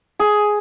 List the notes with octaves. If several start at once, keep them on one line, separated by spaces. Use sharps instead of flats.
G#4